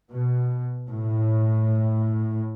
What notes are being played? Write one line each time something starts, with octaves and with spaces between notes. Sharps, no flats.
B2
A2